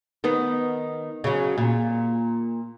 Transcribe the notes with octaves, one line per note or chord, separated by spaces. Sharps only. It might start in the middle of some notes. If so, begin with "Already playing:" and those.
D#3 B3
C#3 F#3
A#2